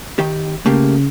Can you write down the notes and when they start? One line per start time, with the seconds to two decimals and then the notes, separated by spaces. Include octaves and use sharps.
0.19 D#3 G4
0.66 C#3 A3 A#3 G4